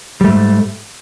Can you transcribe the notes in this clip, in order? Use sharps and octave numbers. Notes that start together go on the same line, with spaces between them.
G#2 G3 A3